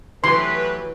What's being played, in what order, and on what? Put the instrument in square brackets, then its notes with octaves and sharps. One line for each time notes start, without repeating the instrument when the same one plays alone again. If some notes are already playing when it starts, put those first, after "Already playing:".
[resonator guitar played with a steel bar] E3 F#3 [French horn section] A3 G4 B4 [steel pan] C6